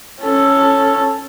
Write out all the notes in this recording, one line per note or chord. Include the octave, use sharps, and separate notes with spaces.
C#4 A4